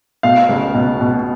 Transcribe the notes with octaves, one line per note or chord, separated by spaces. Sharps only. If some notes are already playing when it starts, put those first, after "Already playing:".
B2 F5
C#2
B2
B2